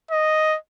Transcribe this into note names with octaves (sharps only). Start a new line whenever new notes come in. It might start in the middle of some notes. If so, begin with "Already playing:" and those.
D#5